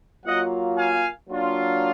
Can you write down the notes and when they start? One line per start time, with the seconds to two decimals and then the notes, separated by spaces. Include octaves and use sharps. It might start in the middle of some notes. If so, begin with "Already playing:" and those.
0.24 F#3 A#3 F4 D#5 F#5
0.76 F5 G#5
1.29 F#3 A#3 D4 F4